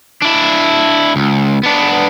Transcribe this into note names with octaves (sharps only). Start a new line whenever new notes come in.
D4 E4
C#2
B3 D4